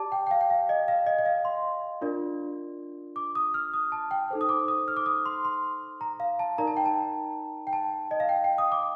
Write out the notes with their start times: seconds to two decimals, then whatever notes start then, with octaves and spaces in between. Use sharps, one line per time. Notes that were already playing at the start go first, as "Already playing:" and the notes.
Already playing: G4 D5 A5 D6
0.12 G5
0.27 G5
0.31 F5
0.41 G5
0.50 F5
0.69 D#5
0.88 F5
1.07 D#5
1.18 D#5
1.26 F5
1.45 C6
2.01 D4 F4 A#4 D5
3.16 D6
3.35 D#6
3.54 F6
3.74 D#6
3.92 A5
4.11 G5
4.31 D#4 A4 C5
4.41 D#6
4.49 D6
4.68 D#6
4.88 F6
4.96 D6
5.06 D#6
5.26 C6
5.45 C6
6.01 A#5
6.20 F5
6.39 A5
6.58 D#4 A#4 D5 A#5
6.67 A5
6.77 G5
6.86 A5
7.67 G5
7.73 A5
8.11 D#5
8.20 F5
8.29 G5
8.44 G5
8.58 D#6
8.72 D6